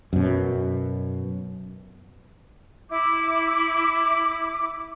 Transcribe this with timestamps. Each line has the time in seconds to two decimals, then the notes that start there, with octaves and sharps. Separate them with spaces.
0.13 F#2 B2
2.90 E4 D6